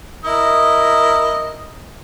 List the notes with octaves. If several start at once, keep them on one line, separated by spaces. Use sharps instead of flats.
E4 A#4 D#5